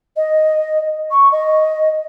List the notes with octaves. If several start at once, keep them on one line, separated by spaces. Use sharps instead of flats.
D#5
C#6
D#5